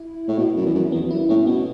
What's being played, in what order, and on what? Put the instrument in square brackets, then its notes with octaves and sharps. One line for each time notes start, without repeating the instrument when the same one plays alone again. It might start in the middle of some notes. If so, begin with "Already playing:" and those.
Already playing: [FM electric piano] E4
[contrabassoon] A2
B2
F#2
E2
F#2
[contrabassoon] E2 [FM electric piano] B3
[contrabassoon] F#2 [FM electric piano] E4
[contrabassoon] A2 [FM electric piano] C#4
[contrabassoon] B2 [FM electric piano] B3